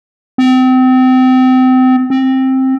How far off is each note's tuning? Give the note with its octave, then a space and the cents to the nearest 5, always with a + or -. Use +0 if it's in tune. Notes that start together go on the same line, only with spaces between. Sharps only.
C4 -30
C4 +10